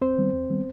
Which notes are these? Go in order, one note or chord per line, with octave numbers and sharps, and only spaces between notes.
E2 C4 C5
D#3 G3 B3
E2
D#3 G3 B3